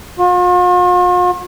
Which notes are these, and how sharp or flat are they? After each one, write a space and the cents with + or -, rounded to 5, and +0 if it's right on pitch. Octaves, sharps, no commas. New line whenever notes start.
F4 +45